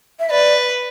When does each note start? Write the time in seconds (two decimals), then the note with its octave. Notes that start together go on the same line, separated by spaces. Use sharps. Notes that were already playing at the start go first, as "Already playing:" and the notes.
0.20 E5
0.30 B4 D5